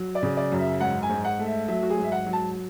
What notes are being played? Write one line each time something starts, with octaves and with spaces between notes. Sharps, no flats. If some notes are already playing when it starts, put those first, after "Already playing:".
Already playing: F#3
D5
C#3
D5
F#2
E5
G#2 F#5
G#5
G#2
F#5
A3
E5
F#3 E5
F#4
G#4
G#2
E5
F#5
F#3
A5